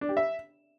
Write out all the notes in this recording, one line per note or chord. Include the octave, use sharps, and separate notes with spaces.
D4
G4
E5